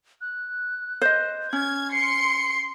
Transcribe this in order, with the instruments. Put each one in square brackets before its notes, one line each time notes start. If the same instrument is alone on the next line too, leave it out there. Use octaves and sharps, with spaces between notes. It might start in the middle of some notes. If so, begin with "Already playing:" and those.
[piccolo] F#6
[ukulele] C5 D#5
[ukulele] C#4 [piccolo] F6 [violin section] G#6
[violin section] C6 C#7 [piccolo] C7